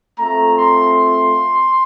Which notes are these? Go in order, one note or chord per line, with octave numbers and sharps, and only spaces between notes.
A3 C4 F4 A#5
C6